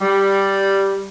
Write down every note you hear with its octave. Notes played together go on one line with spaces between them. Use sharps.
G3